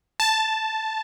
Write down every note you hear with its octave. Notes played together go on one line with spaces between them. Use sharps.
A5